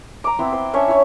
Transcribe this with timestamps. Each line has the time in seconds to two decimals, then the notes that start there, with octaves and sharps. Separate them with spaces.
0.24 A#5 D6
0.39 B3 C4 E4 C5
0.52 C5
0.73 C#4 D4 C#5 E5
0.88 E4 C#5